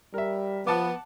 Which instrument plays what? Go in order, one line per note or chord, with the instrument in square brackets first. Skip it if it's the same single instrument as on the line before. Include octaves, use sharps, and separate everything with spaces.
[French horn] G3 [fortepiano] A#4 E5
[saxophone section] F3 B3 [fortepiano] F#5 A5 D6